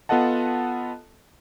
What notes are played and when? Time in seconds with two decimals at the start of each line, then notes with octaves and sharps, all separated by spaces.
0.09 B3 F4 A4 D#5 F#5 A5